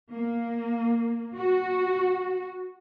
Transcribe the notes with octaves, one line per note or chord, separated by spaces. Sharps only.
A#3
F#4